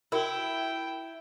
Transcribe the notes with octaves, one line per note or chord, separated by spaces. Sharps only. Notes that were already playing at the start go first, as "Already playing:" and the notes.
E4 F#4 A#4 G5